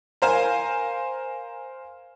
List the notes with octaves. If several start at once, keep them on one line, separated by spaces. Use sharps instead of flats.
A#4 C5 F5 G#5